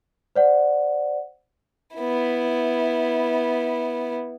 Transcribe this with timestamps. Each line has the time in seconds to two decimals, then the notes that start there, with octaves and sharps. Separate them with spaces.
0.35 C5 D5 F#5
1.96 B3 E4